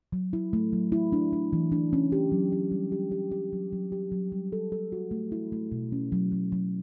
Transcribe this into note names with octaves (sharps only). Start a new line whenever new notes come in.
F#3
E4
A3
F#3
E4
D4
D4
E3
D4
C#4
G4
F#3
G4
G3
G4
G4
G4
F#3
F#3
G4
F#3
G3
A4
A4
F#4
A3
E4
A3
B2
C#4
F#3
F#3
F#3